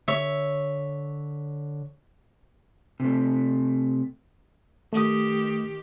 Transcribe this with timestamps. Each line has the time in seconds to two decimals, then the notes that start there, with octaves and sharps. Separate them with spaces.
0.08 D3 C#5 E5
3.00 C3 A3
4.93 D#3 A3 G4 D#6